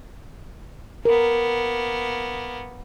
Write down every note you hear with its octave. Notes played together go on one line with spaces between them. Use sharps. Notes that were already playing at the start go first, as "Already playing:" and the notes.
A#3 B3 A#4